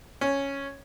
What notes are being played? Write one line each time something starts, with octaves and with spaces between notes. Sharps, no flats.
C#4